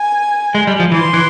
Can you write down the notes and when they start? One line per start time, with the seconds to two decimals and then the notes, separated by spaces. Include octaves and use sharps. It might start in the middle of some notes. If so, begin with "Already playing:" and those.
Already playing: G#5
0.55 G#3
0.67 G3
0.80 F3
0.92 E3 C6
1.13 E3